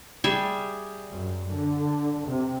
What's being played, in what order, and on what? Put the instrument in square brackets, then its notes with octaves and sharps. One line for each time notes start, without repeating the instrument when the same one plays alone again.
[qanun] G3 G#4 E5
[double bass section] F#2
D3
C3